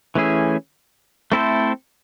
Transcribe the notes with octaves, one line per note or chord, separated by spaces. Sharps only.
E3 A3 C#4 E4 G#4
A3 C4 E4 A4 C5